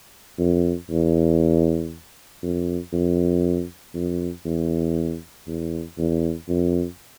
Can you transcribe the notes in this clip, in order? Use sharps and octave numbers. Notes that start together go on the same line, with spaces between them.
F2
E2
F2
F2
F2
E2
E2
E2
F2